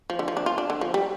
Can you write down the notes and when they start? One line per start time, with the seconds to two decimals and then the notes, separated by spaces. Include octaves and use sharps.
0.10 F3
0.19 D3
0.28 F3
0.37 D4
0.46 F4
0.58 D4
0.70 D3
0.81 F3
0.94 G3